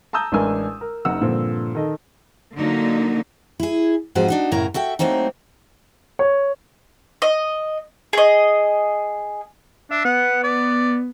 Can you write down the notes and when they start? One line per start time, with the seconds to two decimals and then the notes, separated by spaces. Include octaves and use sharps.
0.13 A5 A#5 D#6 E6 G6
0.32 A1 G#3 D4 A#4 G#5 E6
0.81 A#4
1.05 F#1 D#4 F#5 E6
1.21 G2 A#2 D3 F3 C4
1.75 D#3 A4 D#5
2.56 D3 F#3 A#3 D#4
3.60 E4 G#4
4.15 G#2 F3 C4 F#4 G#4
4.28 D4 D#4 F#4
4.51 F#2 A2 C#3 E4 A#4 A#5
4.74 F#4 A4 E5 G5
4.99 F#3 A3 A#3 C4 D#4
6.19 C#5
7.22 D#5
8.13 G#4 D#5
9.91 D4 E5
10.05 B3 F#5
10.44 D5